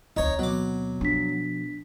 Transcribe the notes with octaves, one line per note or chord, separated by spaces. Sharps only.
D2 C4 D#4 C#5
B2 F#3 D6
F3 D4 B6